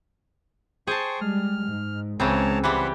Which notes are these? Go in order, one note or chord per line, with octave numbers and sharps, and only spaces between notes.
G#4 C5 G5 A5 C#6 G6
G3 G#3 F6
G#2
C#2 C#3 E3 C4 C#5 A5 A#5
E3 G3 G4 C5 F#5 B5